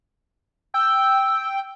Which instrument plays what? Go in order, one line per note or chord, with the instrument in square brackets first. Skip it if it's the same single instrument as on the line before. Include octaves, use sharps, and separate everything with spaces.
[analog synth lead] G5 [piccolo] E6